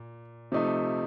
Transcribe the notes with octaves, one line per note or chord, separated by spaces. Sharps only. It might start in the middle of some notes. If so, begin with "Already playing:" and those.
Already playing: A#2
C3 F3 A3 D#4